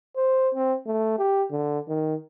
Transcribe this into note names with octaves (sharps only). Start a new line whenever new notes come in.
C5
C4
A3
G4
D3
D#3